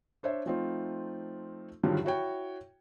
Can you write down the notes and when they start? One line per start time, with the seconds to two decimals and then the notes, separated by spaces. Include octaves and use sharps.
0.23 D4 C5 C#5 E5
0.46 F3 A3 C4 D#4 F4
1.83 G2 D3 D#3 F3 F#3
2.05 E4 F#4 C#5 G5